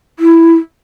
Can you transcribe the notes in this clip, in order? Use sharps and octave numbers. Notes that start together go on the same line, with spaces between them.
E4